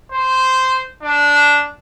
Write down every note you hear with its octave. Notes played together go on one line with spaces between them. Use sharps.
C5
D4